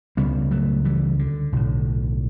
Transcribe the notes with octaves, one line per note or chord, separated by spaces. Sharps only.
C#2 C#3 G3 B3
F#3 A3
E3 G3
D3
B1 A2